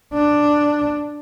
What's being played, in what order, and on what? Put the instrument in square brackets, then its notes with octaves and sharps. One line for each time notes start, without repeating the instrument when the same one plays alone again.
[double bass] D4